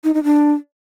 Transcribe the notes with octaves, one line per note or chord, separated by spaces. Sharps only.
D#4
D#4
D4